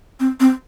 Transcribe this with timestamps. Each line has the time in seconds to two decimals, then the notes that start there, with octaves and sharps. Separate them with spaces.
0.20 C4
0.40 C4